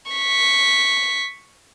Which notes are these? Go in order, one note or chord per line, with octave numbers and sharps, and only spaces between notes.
C#6 B6